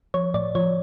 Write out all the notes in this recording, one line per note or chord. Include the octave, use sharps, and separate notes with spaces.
F3 C#5
A2 D5
F3 C#5